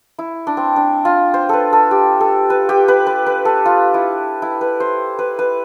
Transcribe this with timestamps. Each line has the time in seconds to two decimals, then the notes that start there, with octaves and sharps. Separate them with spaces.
0.19 E4
0.47 D4
0.57 C4
0.76 D4
1.05 F4
1.34 C5
1.49 A4 B4
1.73 A4
1.91 G4
2.20 A4
2.50 B4
2.69 G4
2.88 B4
3.07 B4
3.26 B4
3.45 A4
3.66 F4
3.94 E4
4.42 E4
4.61 B4
4.80 C5
5.19 B4
5.39 B4